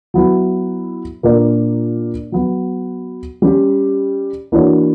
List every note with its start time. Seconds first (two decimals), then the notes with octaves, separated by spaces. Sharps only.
0.14 F#3 B3 E4
1.23 A#2 A#3 D4 A#4 D5
2.32 F#3 B3 F#4
3.42 G3 C#4 G4
4.52 E3 A#3 D4 F#4 C#5